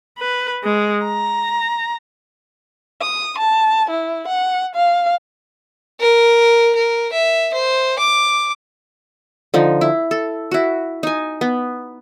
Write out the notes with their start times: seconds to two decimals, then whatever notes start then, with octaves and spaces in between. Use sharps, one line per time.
0.19 B4
0.64 G#3
1.05 A#5
3.01 D#6
3.38 A5
3.90 E4
4.27 F#5
4.75 F5
6.00 A#4
6.75 A#4
7.12 E5
7.54 C5
7.99 D6
9.54 D3 F3 D#4
9.81 E4
10.11 A4
10.51 E4 F#4
11.03 D#4 G#5
11.41 B3